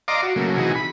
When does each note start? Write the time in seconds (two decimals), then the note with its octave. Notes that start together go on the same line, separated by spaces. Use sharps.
0.08 D5 D#5 F5 A#5 C6 D6
0.23 F#4
0.36 C#3 F#3 A3 A#3
0.57 C3 E3 D#4 F#4 G#4
0.75 B5